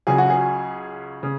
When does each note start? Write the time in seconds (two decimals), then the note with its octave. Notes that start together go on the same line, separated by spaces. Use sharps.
0.07 C#2 C#3 F#3 G#4
0.18 F#4
0.30 G#4
1.23 C#3